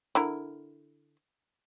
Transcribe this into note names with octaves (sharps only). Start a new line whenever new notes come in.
D3 E4 A#4